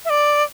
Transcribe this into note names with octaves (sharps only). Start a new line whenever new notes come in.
E5
D5